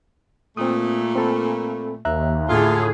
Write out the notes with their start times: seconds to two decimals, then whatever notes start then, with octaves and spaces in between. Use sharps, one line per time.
0.57 A#2 A3 C4 D#6
1.16 C4 A4 B5
2.05 D#2 E5 A#5 F#6
2.49 A2 D3 F4 G#4